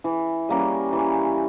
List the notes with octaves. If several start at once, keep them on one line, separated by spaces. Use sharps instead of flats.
E3
G3 A#3 C#4
E3